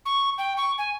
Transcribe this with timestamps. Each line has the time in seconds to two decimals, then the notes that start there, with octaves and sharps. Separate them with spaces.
0.06 C#6
0.38 G5
0.57 C#6
0.78 G#5